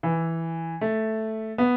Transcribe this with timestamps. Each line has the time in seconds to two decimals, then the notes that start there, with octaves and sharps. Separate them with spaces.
0.03 E3
0.81 A3
1.58 B3